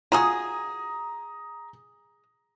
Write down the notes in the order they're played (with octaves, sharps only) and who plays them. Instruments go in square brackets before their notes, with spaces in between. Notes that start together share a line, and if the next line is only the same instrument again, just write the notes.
[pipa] F4 F#4 G#4 [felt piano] A#5 D#6